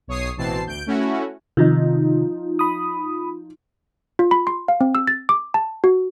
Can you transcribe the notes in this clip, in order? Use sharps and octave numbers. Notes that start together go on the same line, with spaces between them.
B1 C#5 D#6 C7
A1 B2 E3 C4 A5 C7
D2 G6 D7
A3 C#4 E4 F#4
C3 D#3 F3 D#4
B5 D#6
F4
B5
C6
F5
C4
E6
A6
D6
A5
F#4